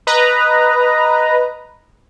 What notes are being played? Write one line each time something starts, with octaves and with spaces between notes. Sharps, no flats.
B4 D#5 A#5